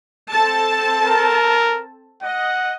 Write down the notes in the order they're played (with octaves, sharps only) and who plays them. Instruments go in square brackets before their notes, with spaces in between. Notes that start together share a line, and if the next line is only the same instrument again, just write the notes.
[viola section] C4 A4 A5
[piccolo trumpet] A#4
[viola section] D#5 [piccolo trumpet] F#5